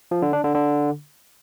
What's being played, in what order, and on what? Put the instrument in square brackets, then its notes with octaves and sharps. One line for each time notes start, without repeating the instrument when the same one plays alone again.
[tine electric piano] F3
D3
D4
D3
D3